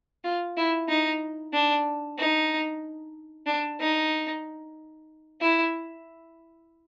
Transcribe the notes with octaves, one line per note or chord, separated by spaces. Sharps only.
F4
E4
D#4
D4
D#4
D4
D#4
E4